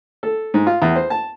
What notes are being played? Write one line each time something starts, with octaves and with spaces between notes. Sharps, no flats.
A4
G#2
F4
E2
C5
A5